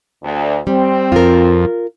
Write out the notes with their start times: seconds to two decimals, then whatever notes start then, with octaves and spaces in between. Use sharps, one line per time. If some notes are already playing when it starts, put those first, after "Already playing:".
0.23 D2
0.67 G3 C4
1.12 F2 F4 A#4